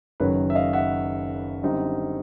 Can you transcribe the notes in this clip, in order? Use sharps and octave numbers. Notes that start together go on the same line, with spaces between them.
F#1 F#2 D#3 F#3 B4
E5
D#5 F5
E5 F#5
F#2 D3 G3 C4 D#4